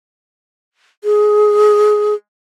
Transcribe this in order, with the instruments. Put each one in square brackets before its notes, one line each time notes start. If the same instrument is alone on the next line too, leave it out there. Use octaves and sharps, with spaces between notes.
[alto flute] G#4